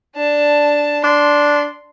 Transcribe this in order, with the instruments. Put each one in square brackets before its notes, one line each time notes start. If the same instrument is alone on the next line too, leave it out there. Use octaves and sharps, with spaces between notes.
[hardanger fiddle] D4 A5
[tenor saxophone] D4 [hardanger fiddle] C6